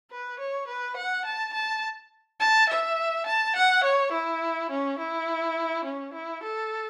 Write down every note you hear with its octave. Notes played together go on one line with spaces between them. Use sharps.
B4
C#5
B4
F#5
A5
A5
A5
E5
A5
F#5
C#5
E4
C#4
E4
C#4
E4
A4